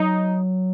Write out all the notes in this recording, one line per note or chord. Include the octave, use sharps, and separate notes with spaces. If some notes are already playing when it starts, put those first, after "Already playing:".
Already playing: F#3 D#4